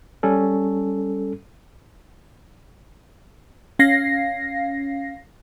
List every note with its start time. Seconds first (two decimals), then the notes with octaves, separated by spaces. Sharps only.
0.23 G3 C#4 A4
3.79 C#4 F5 A#6 C7